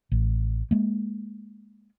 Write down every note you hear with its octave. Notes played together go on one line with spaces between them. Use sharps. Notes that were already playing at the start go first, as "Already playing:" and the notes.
A1
G#3 A#3